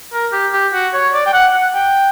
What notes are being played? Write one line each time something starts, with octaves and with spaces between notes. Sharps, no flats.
A#4
G4
G4
F#4
C#5
D5
G5
F#5
F#5
G5